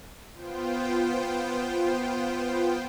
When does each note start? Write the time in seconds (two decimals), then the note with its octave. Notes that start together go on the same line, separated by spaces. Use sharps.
0.35 B3 F4 C5 G5